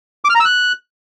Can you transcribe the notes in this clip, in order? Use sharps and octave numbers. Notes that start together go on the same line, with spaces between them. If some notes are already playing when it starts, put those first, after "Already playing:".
D6
F6
A#5
E6
F#6